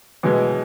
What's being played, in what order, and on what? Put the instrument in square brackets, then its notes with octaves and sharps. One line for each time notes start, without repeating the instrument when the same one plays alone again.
[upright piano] B2 G#3 B3 [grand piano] E3 F#3